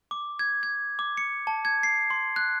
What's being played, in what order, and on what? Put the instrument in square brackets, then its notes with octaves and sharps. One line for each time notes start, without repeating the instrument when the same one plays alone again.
[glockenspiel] D6
G#6
G#6
D6
C#7
A5
G#6
C7
C6
F#6